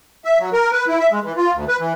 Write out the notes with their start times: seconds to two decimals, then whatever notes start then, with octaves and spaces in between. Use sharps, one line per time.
0.25 E5
0.39 F#3
0.53 A#4
0.71 B4
0.87 E4
0.99 E5
1.11 G#3
1.24 E3
1.37 F4
1.54 D2
1.68 B4
1.79 E3